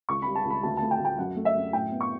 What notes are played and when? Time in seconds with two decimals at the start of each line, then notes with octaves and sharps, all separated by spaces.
0.09 C#2 C#6
0.22 B5
0.27 G3
0.35 A5
0.45 C#2
0.50 B5
0.63 D2 A5
0.77 A5
0.82 A3
0.91 G5
0.99 D2
1.05 G5
1.18 F#2 F#5
1.36 A3
1.45 E5
1.55 F#2
1.73 A2 G5
1.92 B3
2.01 C#6